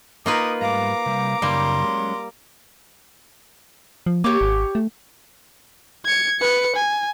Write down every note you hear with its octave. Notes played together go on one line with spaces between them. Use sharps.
A#3 D#4 F4 A#4 B4 D#6
G#2 G3 A3 F5 A#5 D6
C3 G3
F#2 C#3 G3 A#3 D#4 C6
F#3 G#3 C#4
F3
A#3 G4 C#5 D6
G#1
A3
G#6 C#7
B4 C#7
G#5